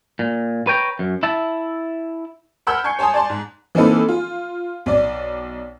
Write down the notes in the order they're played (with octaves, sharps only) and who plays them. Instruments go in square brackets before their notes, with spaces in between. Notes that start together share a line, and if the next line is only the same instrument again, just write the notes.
[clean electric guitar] A#2
B4 C#5 G5 A#5
F#2
E4 E5 A5
[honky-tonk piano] A#4 F#5 B5 E6 F6 G6
G#5 C#6 G6 G#6 C7 C#7
C#5 G#5 A5 C6 D#6
D5 G#5 A5 C6
G#2
E3 A#3 C4 D#4 A4 B4
F4
B1 D5